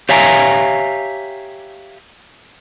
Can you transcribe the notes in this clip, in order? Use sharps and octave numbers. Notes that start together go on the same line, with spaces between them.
G4 C#5 E5 F5 G#5 A#5